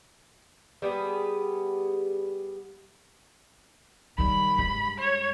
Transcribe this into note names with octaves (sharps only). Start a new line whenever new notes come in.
G3 B3 G#4
D#3 G3 B5
G2 G#3
C#5